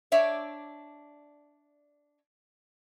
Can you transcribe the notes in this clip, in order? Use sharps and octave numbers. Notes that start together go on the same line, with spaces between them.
D4 C#5 D5 E5